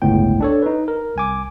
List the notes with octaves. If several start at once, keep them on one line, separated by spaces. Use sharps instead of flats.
G1 C#2 A2 B3 G5
D4 A4 C#5
D#4 B4
A#4
C2 G#5 D6